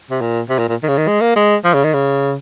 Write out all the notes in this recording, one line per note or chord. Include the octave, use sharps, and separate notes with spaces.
C3
A#2
C3
A#2
A#2
D#3
C#3
D#3
G#3
A#3
G#3
F3
C#3
D#3
C#3